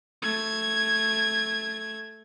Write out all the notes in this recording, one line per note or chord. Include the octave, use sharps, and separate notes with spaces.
A3 G#6